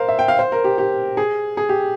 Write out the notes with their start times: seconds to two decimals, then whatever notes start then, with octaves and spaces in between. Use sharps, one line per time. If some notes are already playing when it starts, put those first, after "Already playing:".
Already playing: A#4 C5 F5
0.08 E5
0.19 G5
0.28 F5
0.39 C5
0.52 A#4
0.64 G4
0.78 G4
1.17 G#4
1.57 G#4
1.69 G4